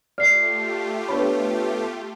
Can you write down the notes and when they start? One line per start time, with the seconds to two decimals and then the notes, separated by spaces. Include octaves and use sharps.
0.18 A3 F4 G4 D5 F6 C7
1.09 B3 D4 C#5 B5